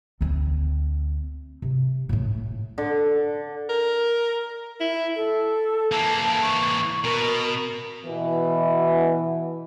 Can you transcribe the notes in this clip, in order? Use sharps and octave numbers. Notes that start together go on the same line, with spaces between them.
D2 C4
C3
A2 A3
D3
A#4
E4
A4
E3 A#3 A5
C#6
B2 A#4
B2 E3